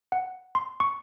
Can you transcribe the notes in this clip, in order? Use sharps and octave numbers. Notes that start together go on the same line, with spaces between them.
F#5
C6
C#6